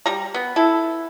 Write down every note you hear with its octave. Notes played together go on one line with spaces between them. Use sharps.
G3 A#5
B3
E4 A4